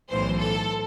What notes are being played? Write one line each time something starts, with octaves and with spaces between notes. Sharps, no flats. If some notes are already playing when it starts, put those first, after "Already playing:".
B1 A2 E3 C5
A4